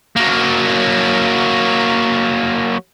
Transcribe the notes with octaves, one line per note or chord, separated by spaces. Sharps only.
F#3 A#3